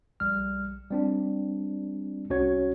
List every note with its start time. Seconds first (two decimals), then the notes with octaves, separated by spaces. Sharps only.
0.20 A#1 G3 F6
0.90 G3 C4 D4
2.30 C2 C#4 F#4 C#5 G#6